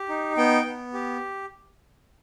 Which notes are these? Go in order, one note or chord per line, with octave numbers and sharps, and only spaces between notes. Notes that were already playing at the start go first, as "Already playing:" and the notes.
Already playing: G4
D#4
B3 G5
B3
G4